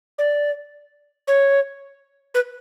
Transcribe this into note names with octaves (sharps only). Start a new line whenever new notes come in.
D5
C#5
B4